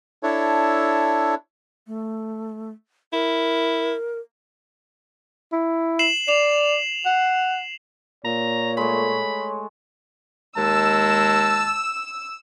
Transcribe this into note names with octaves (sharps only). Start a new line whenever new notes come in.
D4 E4 A4 C#5
A3
E4 A#4
E4
C7 E7 F#7
D5 E7 F7
F#5
A#2 C#5 A#5
G#3 A3 B5
D#2 G#3 A5 E6